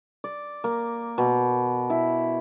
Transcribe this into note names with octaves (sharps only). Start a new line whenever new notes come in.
D5
A#3
B2
E4